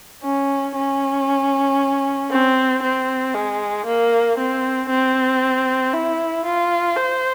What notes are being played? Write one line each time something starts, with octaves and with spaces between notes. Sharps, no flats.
C#4
C#4
C4
C4
G#3
A#3
C4
C4
E4
F4
C5